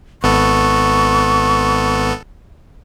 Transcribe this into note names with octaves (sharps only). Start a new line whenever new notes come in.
G#1 B3 A4 C#6